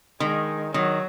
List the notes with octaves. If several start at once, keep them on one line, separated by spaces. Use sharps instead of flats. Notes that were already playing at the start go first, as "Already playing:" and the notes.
D#3 G#3
D#3 F#3